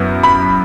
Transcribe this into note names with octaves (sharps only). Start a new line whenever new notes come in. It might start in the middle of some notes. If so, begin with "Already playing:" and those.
Already playing: F#2 B3 E4
B5